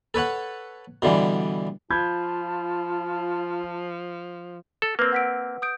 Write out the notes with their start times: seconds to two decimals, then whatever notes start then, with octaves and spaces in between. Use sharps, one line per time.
0.14 A4 B4 C#5 F#5
1.02 B2 D3 E3 G3
1.90 F3 F4 A5 B5 G6 G#6
4.82 A4
4.99 A#3 C4 B4 E6
5.12 F#5 B6 D7
5.62 D#6 G6 D7